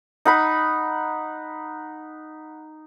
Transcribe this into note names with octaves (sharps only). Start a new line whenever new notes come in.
D#4 F#5 B5